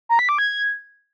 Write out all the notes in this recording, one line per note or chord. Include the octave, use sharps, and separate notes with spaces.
A#5
B6
D6
G#6